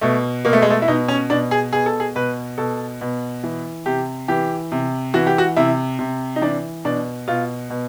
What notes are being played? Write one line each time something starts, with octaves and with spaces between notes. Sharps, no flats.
B2 A3
B2 A#3
A3
G#3
A3
E4
B2 D#4
C#4
B2 D4
G#4
B2 G#4
A4
G#4
B2 B4
B2 A4
B2
E3
C3 G4
E3 G4
C3
E3 F#4
G4
F#4
C3 E4
C3
D#4
E3 D4
B2 D4
B2 F4
B2